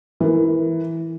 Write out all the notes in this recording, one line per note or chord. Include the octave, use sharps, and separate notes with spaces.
E3 A#4